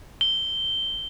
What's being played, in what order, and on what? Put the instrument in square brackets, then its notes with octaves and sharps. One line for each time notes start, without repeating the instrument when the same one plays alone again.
[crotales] G7